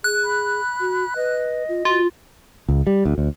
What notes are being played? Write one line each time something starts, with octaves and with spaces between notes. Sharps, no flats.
G#4 F#6
B5
F#4
B4 D#5
F4
F4 F#4
C#2
G3
D2
D2